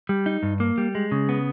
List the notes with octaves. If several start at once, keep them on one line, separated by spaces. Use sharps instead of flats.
G3
D#4
G2
A#3
G3
G#3
C#3
B3